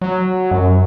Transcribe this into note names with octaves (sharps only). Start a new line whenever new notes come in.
F#3
F#2